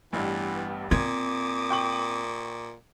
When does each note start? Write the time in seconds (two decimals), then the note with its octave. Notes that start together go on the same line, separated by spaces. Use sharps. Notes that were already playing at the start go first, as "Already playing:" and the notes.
0.13 A1 G2 E3 B3 G4
0.91 A#2 C4 D6 D#6 G#6
1.71 G5 C#6 F#7